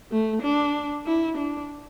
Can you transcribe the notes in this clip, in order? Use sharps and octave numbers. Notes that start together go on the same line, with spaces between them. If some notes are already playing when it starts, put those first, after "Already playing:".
A3
D4
E4
D4